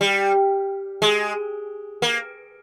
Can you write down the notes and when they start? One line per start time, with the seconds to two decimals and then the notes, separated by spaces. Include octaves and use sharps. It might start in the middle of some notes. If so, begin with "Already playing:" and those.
0.01 G3
1.02 G#3
2.02 A#3